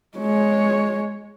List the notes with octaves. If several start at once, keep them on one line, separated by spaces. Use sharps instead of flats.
G#3 C#5